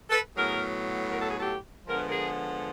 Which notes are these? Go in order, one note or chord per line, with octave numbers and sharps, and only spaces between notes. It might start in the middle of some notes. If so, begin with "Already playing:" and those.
A4 B4
A2 F#3 B3 G#4 A#4
A#4
A4
G#4
G4 A4
D3 F3 G#3 B3 A#4
B4
G#4 A#4